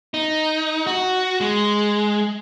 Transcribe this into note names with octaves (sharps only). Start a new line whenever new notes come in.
D#4
F#4
G#3